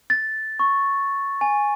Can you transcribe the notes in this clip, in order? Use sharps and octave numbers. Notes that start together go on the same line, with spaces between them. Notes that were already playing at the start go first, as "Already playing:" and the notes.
A6
C#6
G#5